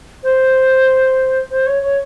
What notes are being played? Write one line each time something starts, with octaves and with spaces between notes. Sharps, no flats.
C5
C5
C#5
C#5